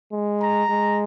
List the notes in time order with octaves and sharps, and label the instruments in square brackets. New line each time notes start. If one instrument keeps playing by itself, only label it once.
[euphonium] G#3
[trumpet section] A#5
[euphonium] G#3